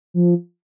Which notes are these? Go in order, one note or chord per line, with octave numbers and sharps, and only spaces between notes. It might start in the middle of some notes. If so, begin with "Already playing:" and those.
F3